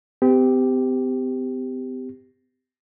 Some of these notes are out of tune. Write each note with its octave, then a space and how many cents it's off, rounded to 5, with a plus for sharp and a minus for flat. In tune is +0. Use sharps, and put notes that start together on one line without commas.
C4 -45 G4 +0